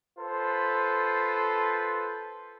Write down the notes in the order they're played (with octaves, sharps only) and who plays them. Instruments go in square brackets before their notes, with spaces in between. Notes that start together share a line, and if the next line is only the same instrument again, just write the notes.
[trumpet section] F4 A4 B4 C5